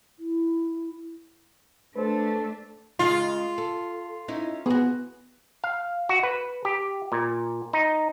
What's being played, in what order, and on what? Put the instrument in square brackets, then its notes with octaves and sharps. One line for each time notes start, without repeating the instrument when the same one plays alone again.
[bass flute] E4
[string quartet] A3 [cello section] D4 [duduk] A4 [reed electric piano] B4 C5
[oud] C#3 G#3 [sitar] F4
[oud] A4
C#4 D#4 E4
[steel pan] B3 [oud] F#4 G#4
[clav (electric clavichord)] F5
F#4
B4
G4
A#2
D#4